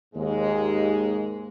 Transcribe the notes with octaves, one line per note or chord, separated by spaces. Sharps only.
D#2 G#2 G#3